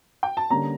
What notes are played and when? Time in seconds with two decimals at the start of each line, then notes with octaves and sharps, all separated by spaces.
0.23 G5
0.37 A5
0.50 D3 G3 A#3 C#4 A#5